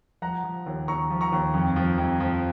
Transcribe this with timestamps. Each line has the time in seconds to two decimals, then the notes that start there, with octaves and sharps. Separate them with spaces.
0.22 F3 F#5 A#5
0.44 F3
0.66 D#2
0.88 D#2 A#5 C#6
1.10 F3
1.21 A#5 C#6
1.32 D#2
1.54 F2
1.76 F3
1.98 F2
2.20 F3